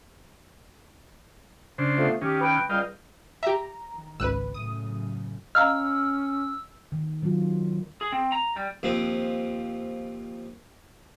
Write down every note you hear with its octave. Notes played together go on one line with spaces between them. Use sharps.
C#3 D4 C5
F3 A3 B3
D#3 C#4 G4
B4 G5
C#2 G3 D#5 F5 G5
G4 E5 A#5
D#3
G#1 C#2 B4 E6 F#6 D#7
F#2 A2 C#3 D#6
C#4 D#5 F5 A#5 E6 F6
D#3
D#3 F#3 C4 F4 F#4
G#4
C4
A#5
G3
D#2 F3 C4